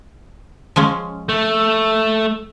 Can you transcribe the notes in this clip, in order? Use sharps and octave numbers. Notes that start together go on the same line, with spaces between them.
F3 G#3 C#4
A3